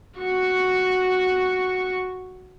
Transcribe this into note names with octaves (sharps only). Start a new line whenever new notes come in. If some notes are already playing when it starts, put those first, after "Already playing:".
F#4 C#6